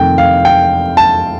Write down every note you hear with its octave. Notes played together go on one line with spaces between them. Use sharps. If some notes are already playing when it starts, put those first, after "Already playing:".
Already playing: F2 C3 D#3 A3 G5
F5
G5
A5